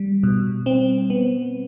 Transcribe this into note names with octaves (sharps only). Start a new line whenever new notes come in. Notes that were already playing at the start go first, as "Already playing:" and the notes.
Already playing: G3
B2
C4
B3